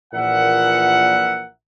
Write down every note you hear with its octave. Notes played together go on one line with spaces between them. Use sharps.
A#1 A#2 E3 A#4 E5 F#5